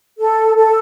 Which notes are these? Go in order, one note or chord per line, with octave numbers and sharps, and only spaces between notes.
A4
A4